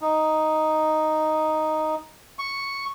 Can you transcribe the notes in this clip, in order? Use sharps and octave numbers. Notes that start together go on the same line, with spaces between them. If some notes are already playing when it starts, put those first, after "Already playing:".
D#4
C#6